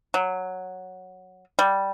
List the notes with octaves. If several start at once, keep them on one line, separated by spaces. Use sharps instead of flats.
F#3
G3